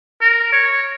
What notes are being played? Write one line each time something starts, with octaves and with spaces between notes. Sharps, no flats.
A#4
C#5